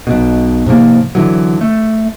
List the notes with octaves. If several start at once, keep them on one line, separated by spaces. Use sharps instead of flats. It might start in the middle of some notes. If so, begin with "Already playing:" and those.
B1 B2
G#2 C3 F3 A#3
D3 E3 F#3
A3